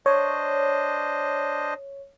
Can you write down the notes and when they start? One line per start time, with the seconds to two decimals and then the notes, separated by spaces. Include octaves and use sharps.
0.06 D4 C5 C#5 D#5